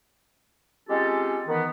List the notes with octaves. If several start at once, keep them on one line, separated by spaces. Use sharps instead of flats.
G#3 C4 C#4 F4 G4 A4
D#3 E3 B3